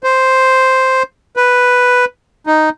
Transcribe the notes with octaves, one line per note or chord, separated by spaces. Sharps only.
C5
B4
D#4